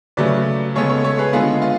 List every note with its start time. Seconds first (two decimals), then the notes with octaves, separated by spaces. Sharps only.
0.17 C#3 F#3 A3 B4 D5
0.75 C#3 G#3 B3 A4 C#5
0.89 A4 C#5
1.04 A4 C#5
1.18 G#4 B4
1.33 D3 G#3 B3 F4 G#4
1.62 F4